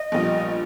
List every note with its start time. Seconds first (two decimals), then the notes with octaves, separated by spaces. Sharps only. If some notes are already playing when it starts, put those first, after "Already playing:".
Already playing: D#5
0.12 A#1 A#2 G3